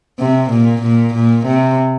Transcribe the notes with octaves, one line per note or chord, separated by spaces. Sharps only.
C3
A#2
A#2
A#2
C3